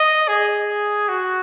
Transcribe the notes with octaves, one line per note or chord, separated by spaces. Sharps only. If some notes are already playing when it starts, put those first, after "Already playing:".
Already playing: D#5
G#4
F#4